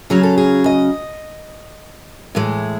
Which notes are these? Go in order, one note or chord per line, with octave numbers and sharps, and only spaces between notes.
C#3 F#3 C#4 G#4
A4
G#4
D#5
A2 E3 G#3